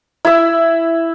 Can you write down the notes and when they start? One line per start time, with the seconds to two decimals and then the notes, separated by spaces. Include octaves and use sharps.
0.25 E4 E5